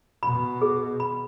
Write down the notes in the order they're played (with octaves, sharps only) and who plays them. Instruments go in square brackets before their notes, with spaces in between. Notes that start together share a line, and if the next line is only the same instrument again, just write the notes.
[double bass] B2 [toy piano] B5
[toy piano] G#4
B5